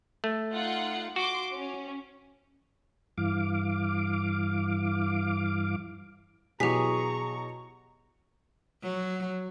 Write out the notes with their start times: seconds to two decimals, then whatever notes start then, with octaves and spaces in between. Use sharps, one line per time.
0.24 A3
0.53 D#4 F4 F#5
1.16 F#4 C6 D6
1.54 C#4
3.18 G2 E3 F5 D6
6.60 B2 E3 F#3 G4 G#4 A#5 C#6 B6
8.83 F#3